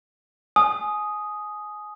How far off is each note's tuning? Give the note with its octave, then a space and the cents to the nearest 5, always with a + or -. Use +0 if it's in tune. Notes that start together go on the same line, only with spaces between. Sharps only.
G#5 +25 D#6 +0